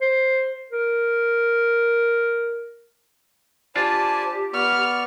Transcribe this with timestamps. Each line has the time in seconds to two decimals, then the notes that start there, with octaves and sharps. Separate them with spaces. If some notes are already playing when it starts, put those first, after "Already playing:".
0.01 C5
0.71 A#4
3.76 D4 F4 G4 C5 D5 G#5 A5
4.54 B3 D5 C#6 F6